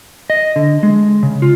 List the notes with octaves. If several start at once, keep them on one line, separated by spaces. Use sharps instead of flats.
D#5
D3
G#3
C#3
F4